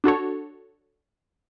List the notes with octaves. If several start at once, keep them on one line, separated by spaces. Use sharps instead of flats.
D4 F#4 A4 C#5